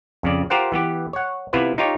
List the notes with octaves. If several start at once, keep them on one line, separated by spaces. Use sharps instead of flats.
F2 C#3 D5
F4 G4 A#4 C5 F#5
E3 B3 G4
C#5 F#5
C3 B3 E4 F4 B4
D#4 F4 G4 C#5